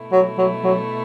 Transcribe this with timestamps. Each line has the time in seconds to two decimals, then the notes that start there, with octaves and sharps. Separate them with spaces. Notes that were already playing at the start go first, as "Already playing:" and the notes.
Already playing: B2 A3 E4
0.12 F#3
0.38 F#3
0.64 F#3